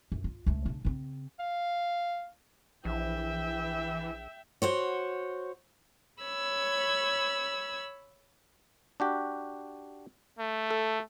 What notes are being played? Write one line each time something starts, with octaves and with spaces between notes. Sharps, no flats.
F#2
F4
C#2 A3
C#3 D4
C#3 C4
F5
A#1 E3 E5 G5
F#4 C5 C#5
C#5 B5 E6 G#6
D4 F#4 G4
A3
A4